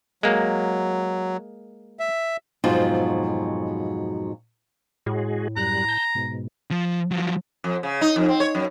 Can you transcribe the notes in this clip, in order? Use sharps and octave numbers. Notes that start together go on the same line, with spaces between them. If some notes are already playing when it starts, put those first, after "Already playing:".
F#3 G#3 A#3
E5
F2 G#2 B2 F#3 D#4 F4
A2 G#3 F#4 G#4
F#2 G3 A#5 F#6
A5 G6
G#2 B2
F3
F3 F#3
F2
C#3
D#4
F2
C4
C#5
F#2